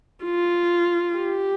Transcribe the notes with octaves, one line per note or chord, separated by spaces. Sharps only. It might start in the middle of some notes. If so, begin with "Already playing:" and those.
F4
G4